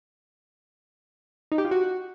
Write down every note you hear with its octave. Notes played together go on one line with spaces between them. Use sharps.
D#4
G4
F4
F#4